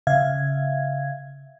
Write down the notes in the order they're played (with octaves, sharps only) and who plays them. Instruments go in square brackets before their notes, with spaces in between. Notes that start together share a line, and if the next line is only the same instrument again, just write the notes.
[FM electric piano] C#3 E5 F5 G#6